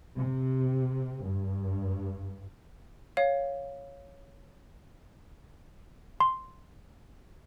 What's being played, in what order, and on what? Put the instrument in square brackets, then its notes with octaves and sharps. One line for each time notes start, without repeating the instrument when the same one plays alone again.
[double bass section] C3
G2
[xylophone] C#5 F5
[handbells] C6